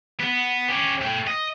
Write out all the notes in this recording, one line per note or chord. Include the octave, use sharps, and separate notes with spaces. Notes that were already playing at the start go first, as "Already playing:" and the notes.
B3
C#4 G4
A3 G5
D#5